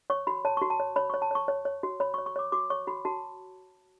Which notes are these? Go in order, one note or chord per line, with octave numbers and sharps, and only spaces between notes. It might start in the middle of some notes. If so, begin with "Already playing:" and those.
C#5 C#6
F#4 B5
C#5 A5
C#6
F#4
A5
C#5
C#5 B5
C#6
C#5
A5
C#5 C#6
C#5
C#5
F#4
C#5 B5
C#6
C#5
C#6
C#5 D6
F#4 D6
C#5 C#6
F#4 B5
F#4 A5